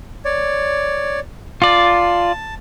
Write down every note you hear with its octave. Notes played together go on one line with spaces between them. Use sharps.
C#5 D5
F4 D5 A5